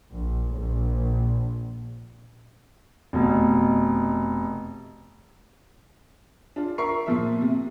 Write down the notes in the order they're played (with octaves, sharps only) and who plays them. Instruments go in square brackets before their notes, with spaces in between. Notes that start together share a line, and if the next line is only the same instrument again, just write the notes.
[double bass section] A#1
A#1
[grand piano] F1 B2
[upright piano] D4 F4
A#4 E5 C#6 C7
A#2 F3 E5
C3